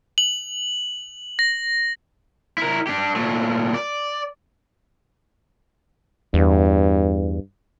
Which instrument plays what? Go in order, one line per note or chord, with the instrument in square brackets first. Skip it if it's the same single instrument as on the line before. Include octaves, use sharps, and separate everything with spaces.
[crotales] F#7
A#6
[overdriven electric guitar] E4 A#4
D4 G4
A#2 A3
D5
[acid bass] E2 [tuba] G2